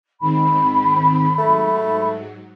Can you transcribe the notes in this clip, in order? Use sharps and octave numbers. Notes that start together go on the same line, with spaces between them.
G#2 D#3 C4 B5
G#2 F#3 A3